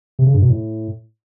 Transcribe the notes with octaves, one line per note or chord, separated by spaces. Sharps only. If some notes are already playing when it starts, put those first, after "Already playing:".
C3
C#3
G2
B2
A2